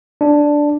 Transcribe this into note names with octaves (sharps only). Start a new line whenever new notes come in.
D4